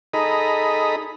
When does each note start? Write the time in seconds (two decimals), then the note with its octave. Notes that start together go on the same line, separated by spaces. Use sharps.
0.14 D#4 G#4 A4 D#5 A#5 B5